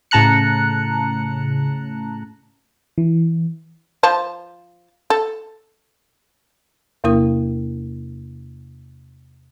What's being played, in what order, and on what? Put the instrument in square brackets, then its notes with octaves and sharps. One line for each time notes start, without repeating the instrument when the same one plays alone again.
[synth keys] A2 C#3 A5 A#5 F#6 C#7
[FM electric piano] E3
[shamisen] F3 A5
A4
[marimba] E2 C3 A#3 E4 A#4 D#6